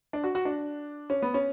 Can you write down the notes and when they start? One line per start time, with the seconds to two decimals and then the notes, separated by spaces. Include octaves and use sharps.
0.13 D4
0.24 F#4
0.35 F#4
0.45 D4
1.10 C#4
1.22 B3
1.34 C#4